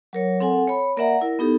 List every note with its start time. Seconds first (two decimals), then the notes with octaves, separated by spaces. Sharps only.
0.13 F#3 A#4 C#5
0.40 C4 A4 F#5 G#5
0.67 C#5 B5
0.97 A#3 A#4 D5 E5 F#5 A#5
1.21 E4 A#4
1.39 B3 D#4 G4 A4